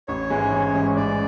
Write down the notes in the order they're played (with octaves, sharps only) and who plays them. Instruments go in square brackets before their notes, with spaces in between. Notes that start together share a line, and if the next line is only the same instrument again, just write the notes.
[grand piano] A1 [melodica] C#5
[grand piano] G#2 E3 G#3 C#4
A1
G#2 E3 G#3 C#4
[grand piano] A1 [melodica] D5